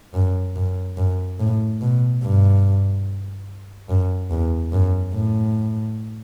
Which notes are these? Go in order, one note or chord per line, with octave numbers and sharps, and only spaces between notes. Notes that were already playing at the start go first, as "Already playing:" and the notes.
F#2
F#2
F#2
A2
B2
G2
F#2
E2
F#2
A2